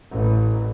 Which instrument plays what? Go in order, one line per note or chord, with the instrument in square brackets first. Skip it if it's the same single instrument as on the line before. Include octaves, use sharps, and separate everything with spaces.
[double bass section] A1